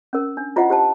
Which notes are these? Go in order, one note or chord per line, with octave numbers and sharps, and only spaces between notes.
C#4 A#4
D4
E4 F4 C5 D#5 F#5
G4 C5 A5